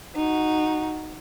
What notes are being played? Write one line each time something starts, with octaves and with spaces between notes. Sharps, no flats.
D#4 F#4